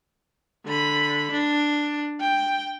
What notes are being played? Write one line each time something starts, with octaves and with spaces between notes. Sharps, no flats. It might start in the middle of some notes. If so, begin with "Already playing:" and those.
D3 B5
D4
G5